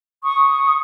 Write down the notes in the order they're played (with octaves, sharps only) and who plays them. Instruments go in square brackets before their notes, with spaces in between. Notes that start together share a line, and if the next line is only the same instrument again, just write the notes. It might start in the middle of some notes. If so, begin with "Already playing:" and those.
[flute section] C#6 D#6